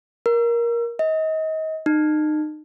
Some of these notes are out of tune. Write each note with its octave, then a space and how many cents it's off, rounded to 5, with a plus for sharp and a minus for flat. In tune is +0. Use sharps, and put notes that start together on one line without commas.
A#4 +15
D#5 +30
D#4 -30